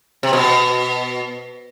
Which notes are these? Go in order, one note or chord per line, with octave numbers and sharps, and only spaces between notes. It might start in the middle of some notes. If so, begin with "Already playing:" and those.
C3
B2